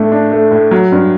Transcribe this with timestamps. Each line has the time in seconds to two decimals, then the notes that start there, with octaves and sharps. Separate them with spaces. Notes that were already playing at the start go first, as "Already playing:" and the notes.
Already playing: A2 A3 D4
0.12 D4
0.31 A3
0.51 A2
0.71 F#3
0.92 G2